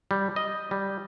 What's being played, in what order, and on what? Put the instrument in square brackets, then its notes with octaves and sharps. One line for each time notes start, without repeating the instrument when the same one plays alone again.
[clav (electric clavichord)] G3
D#5
G3